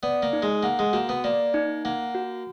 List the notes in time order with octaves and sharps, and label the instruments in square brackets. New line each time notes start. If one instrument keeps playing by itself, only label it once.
[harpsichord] B3 [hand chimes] D5
[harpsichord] A#3
[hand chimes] D#4
[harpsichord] G#3
[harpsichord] A#3 [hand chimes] F#5
[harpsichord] G#3
[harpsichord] A#3 [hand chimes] F#4
[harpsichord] B3
[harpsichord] A#3 [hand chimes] D5
[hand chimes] D#4
[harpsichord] A#3 [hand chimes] F#5
[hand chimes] F#4